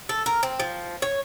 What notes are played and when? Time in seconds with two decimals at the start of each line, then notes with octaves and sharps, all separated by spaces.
0.09 A4
0.26 A#4
0.43 C4
0.60 F3
1.02 C#5